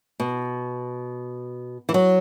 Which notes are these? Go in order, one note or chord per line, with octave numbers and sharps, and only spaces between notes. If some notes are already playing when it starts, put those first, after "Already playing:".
B2
E3
F#3